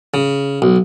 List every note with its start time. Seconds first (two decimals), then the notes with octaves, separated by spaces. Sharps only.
0.14 C#3
0.62 B1